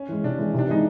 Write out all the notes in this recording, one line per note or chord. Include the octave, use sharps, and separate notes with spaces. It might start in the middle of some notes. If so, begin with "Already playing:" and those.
Already playing: C#4
E3 G#3
C3 D4
E3 G#3
C3 D4
E3 G#3 D#4